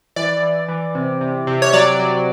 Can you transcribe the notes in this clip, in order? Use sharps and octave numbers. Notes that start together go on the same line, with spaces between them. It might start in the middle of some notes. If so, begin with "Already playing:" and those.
E3 D5
E3
E3
C3
C3
C3
C#5
F#3 D5
F#3